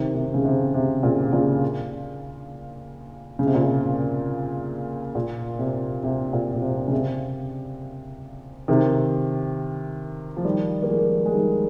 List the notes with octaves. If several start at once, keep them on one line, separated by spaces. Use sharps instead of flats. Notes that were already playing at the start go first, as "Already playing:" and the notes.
Already playing: C3 D#3
C3
C#3
C3
C3
A#2 C#3
A#2 C#3
C#3
C3
A#2
C3
A#2
C3
C3
A#2
A#2
C3
C#3
C3
C3 D#3
F3
D#3 G3
A#3
F3 G#3
G#3
D#3 G3